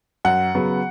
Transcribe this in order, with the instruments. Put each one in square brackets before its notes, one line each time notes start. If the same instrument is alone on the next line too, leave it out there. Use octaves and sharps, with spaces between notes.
[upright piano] F#2 F#5
C#3 F#3 B3